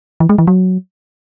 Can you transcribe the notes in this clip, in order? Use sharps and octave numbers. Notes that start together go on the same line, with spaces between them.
E3
G#3
E3
F#3